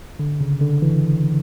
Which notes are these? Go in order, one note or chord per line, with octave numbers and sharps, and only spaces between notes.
D3
C#3
D3
E3